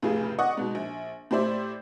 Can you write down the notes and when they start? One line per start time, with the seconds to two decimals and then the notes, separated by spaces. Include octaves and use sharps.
0.02 F1 A2 C#3 F4 G4 G#4
0.39 D5 D#5 F#5 C#6 D#6
0.57 G#2 B2
0.75 A#1
1.31 A2 G4 C5 D5 E5